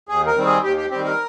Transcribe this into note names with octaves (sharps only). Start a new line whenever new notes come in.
D#2 G#4
A#4
D#3 G3 C4
G#4
D#2 G4
G4
D#3 G3 C4 G4
A#4